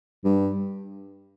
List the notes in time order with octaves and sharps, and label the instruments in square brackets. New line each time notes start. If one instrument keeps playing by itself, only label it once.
[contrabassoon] G2